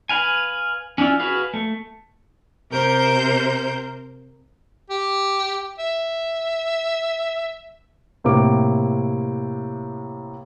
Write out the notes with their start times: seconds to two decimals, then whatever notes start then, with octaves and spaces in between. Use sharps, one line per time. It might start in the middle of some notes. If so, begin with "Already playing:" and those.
0.09 B4 F5 G#5
0.98 C#4 D4 E4 F4
1.20 F#4 G#4 B4 F5
1.54 A3
2.71 C3 A#4 C5 G6
4.90 G4
5.79 E5
8.24 A2 C3 A#3 D6